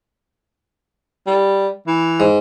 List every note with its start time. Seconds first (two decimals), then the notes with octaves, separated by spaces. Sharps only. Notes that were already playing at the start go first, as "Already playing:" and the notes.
1.27 G3
1.87 E3
2.20 G#2